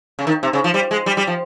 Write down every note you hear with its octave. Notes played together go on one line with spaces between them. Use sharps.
C#3
D#3
C3
C#3
F3
G3
G#3
G3
G3
F3